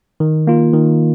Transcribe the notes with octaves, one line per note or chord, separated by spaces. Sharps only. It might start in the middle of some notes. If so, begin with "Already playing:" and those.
D#3
A#3 F4
D#3